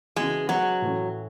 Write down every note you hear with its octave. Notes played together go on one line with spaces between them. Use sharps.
C#3 E3 G#3 B3 F#4
F#3 G#3 B3 F#4 C#5
A2 E3 A3 C#4